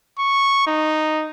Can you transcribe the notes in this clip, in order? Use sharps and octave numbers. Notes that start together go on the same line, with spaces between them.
C#6
D#4